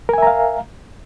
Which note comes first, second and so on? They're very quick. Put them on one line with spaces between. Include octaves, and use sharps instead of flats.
A#4 G#5 E5 A#5 F5